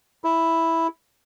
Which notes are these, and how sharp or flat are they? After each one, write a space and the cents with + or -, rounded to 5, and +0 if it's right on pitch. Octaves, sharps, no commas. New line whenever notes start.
E4 -5